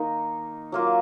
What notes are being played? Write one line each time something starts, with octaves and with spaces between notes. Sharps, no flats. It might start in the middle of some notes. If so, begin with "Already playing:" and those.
Already playing: D#3 A#3 D#4
F#3 A#3 F4